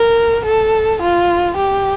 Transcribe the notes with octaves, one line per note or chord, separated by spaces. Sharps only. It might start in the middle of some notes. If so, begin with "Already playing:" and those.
Already playing: A#4
A4
F4
G4